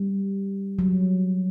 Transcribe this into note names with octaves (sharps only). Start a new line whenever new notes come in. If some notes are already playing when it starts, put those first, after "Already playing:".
Already playing: G3
F#3